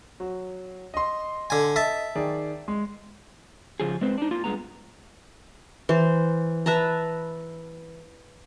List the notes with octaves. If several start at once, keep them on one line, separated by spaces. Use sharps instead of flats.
F#3
D#5 C6
D3 G#5
D#5 E5 A5
D#3 G#4 D5
G#3
C#3 F3 G#4
G#3 C4 B4 C5
D4 D#4
A#3 F4
G2 G#3 B3 A#5
E3 C5
B4 E5 A5 A#5